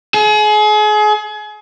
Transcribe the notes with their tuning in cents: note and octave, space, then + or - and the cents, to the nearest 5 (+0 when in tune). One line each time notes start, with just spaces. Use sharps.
G#4 +35